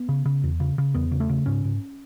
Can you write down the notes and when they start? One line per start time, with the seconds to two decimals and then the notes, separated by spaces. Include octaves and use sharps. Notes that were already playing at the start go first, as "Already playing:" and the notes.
Already playing: B3
0.09 C#3
0.26 C#3
0.43 E2
0.60 C#3
0.78 C#3
0.94 E2 B3
1.12 C#3
1.20 A3
1.29 C#3
1.46 G#2 C#4
1.64 G#2